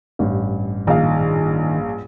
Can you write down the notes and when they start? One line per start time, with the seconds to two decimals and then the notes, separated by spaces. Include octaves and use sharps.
0.19 A1 G2
0.87 A#1 D#3 F5